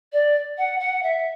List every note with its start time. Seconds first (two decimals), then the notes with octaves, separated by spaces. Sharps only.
0.13 D5
0.58 F#5
0.80 F#5
1.03 E5